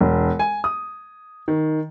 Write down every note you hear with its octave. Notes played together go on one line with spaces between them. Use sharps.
E1
G#5
D#6
D#3